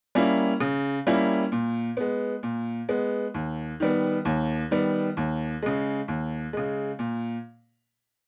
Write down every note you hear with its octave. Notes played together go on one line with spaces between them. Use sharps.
G3 A#3 C#4 E4
C#3
G3 A#3 C#4 E4
A#2
G#3 B3
A#2
G#3 B3
D#2
D#3 G3 B3
D#2
D#3 G3 B3
D#2
C#3 G#3
D#2
C#3 G#3
A#2